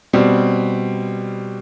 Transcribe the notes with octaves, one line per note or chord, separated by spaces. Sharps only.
B2 G3 C4